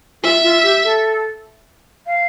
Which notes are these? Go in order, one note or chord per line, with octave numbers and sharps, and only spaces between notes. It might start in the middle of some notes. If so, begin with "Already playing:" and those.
F4 E5
F4
G4
A4
F5